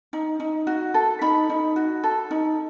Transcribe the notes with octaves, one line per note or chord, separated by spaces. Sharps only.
D#4
D#4
F#4
A4
D#4 B5
D#4
F#4
A4
D#4